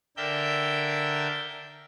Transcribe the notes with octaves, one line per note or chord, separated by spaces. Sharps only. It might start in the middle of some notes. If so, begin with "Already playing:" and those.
D3 D4 A#4 E5 G5 G6